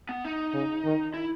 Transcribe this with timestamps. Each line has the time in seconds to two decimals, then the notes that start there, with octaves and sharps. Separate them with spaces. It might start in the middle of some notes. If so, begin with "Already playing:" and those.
0.09 B3
0.25 D#4
0.54 C#3
0.85 D#3
1.14 E4